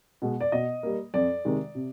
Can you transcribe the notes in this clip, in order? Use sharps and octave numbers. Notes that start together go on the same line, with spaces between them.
B2 G#3
D5
B2 D#5
G3 A#3
F2 D5
C3 D#3 G#3
C3